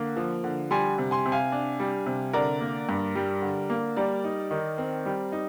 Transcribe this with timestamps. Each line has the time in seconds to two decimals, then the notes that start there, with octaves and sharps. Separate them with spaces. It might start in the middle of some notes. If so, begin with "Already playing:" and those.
Already playing: D3 A#3
0.17 F3
0.44 D3
0.71 G3 G#5 C6
0.98 C3
1.11 G#5 C6
1.25 C3
1.32 F5 G#5
1.52 D4
1.80 G3
2.06 C3
2.33 D3 A#4 D5
2.61 A#3
2.89 G2
3.15 G3
3.42 D3
3.70 A#3
3.96 G3 A#4 D5
4.24 D#4
4.51 D#3
4.78 C4
5.06 G3
5.32 D#4